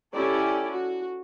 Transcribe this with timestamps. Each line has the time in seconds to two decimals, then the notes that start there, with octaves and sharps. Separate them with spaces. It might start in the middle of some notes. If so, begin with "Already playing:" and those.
0.13 C#4 E4 G4 A4 D5
0.71 F#4